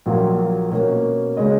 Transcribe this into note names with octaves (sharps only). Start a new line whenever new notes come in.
A#1 A#2 F#3 A#3 F4
B2 A#3 C#4
C#3 G#3 C#4 G#4 D#5